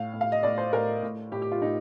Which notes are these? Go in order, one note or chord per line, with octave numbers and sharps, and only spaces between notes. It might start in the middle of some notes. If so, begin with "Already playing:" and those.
Already playing: A2 F5
A2
F5
D#5
A2 D5
C5
A2 A#4
A2
A2 G4
G4
F4
A2 D#4